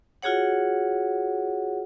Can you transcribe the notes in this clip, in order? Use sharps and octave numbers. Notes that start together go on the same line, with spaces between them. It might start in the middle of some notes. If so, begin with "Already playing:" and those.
F4 F#4 G#4 C#5 F#5